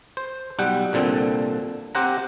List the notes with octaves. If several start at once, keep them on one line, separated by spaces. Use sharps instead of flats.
C5
B1 G3 F#5 G5
C2 A#2 D3 C4
C4 G4 C5 F#5 A#5